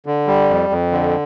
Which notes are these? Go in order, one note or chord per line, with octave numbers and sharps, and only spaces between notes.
D3
G3
F2
F2
D3